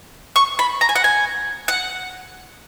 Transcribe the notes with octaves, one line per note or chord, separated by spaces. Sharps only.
C#6
B5
A#5
G#5
F#5
G#5
F#5